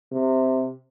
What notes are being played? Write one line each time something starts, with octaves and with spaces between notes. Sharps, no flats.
C3